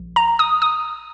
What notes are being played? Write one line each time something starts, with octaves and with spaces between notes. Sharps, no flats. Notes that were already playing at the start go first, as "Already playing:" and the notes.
Already playing: A#1
A#5
D#6
D#6